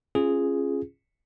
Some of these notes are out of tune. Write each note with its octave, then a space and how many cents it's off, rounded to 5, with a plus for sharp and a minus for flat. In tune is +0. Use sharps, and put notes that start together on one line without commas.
C#4 -25 F4 -20 G#4 +0